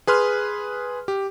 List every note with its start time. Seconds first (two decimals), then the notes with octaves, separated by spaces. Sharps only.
0.07 G#4 B4 C6 F6
1.08 G4